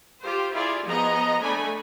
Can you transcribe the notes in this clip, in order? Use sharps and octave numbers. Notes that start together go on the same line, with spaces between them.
F4 G4 C5
E4 F4 G#4 D5
F3 B3 G#4 D#5 A#5
A3 D4 G#5 B5